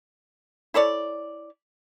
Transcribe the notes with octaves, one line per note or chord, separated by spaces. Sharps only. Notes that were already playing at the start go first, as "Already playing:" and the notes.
E4 A4 C#5 D5